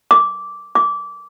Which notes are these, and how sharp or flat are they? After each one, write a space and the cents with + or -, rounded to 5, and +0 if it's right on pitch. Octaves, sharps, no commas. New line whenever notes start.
D6 -10
D6 -20